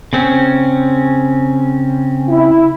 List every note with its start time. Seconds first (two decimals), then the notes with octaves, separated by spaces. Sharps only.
0.13 C#3 C4 C#4
2.29 E4